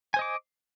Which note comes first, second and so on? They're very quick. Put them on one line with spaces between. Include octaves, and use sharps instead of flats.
G#5 C5 D#5 D6